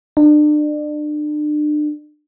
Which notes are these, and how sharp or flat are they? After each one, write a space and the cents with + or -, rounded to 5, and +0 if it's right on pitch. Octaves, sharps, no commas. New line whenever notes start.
D4 +35